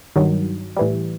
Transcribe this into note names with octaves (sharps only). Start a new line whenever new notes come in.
G2 D#3 F#3
A2 E3 G3